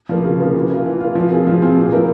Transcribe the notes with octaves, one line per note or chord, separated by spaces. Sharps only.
F3 A#3
C#3
F3 A#3
E3
A#3 F4
E3
A#3 F4
F3
C4 F4 G#4
F3
C4 F4 G#4
A#2
F3 A#3 E4 A#4